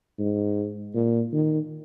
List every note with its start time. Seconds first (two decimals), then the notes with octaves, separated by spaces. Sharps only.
0.19 G#2
0.95 A#2
1.33 D#3